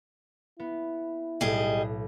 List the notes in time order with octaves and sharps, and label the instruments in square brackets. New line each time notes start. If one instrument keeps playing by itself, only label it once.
[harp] B3 [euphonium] E4
[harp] B1 A2 [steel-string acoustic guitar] G3 G#4 D#5